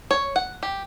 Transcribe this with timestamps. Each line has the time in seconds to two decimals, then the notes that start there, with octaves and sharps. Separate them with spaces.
0.11 C#5
0.36 F#5
0.63 G4